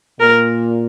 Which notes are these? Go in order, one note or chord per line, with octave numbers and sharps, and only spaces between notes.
A#2 A#4